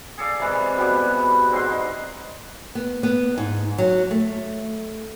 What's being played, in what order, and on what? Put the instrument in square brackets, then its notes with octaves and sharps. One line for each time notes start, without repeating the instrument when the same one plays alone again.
[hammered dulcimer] G#4 A4 D5 F5
C3 E3 G#3
B2 G3 G#3 G4
G#2 C4 D4 C6
D#4
[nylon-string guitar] B3
B3
G#2
F#3
A3